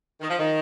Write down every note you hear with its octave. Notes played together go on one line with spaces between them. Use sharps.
D#3
F3
D#3